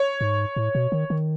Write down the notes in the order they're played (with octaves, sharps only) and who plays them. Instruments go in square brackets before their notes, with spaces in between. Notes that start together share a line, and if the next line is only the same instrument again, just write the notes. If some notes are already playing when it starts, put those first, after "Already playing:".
Already playing: [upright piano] C#5
[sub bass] G#2
A2
B2
D#3
D#3